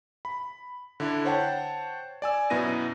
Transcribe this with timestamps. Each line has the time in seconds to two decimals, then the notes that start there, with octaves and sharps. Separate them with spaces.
0.25 B5
1.00 D3 D4 E4
1.25 C5 C#5 F#5 G5 A5
2.22 D5 G#5 E6
2.50 F#2 B2 B3 E4 A#6 D#7